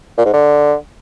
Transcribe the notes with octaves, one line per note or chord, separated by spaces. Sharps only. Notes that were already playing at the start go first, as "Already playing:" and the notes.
A#2
G#2
D3